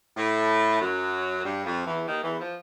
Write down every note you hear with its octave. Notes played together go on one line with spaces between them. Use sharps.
A2 A3
F#2 F#3
G2 G3
F2 F3
E2 E3
D#2 D#3
E2 E3
F3